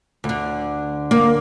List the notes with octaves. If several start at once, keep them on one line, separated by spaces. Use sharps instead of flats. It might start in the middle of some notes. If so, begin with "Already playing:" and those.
D2
D3
A#3